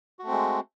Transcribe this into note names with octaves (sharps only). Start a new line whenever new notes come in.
G#3 A3 C4 F#4